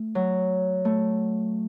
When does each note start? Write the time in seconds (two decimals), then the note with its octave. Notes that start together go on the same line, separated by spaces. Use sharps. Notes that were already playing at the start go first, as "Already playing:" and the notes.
Already playing: A3
0.15 F#3
0.85 A3